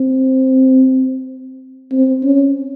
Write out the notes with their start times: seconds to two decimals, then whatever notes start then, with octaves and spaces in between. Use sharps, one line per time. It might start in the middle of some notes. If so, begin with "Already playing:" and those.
Already playing: C4
1.92 C4
2.23 C#4